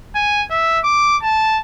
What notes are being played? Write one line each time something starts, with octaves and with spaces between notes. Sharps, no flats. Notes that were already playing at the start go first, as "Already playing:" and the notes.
G#5
E5
D6
A5